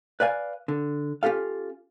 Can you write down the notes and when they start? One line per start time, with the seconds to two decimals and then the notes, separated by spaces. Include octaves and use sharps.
0.20 B4 D5 F5 G#5
0.68 D3
1.23 C#4 F4 G4 A4 F5